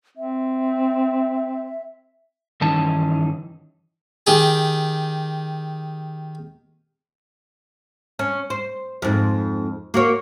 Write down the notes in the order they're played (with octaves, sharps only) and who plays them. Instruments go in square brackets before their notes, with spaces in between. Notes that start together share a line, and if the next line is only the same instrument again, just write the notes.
[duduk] C4 [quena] E5
[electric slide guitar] G2 D#3 E3 C#4 D#4 A5
[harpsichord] D#3 G4 G#4
[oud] C#4
C5
F2 G#2
A#3 F#4 C#5